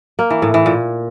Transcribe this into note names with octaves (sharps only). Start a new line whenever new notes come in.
A#3
E3
A2
E3
A#2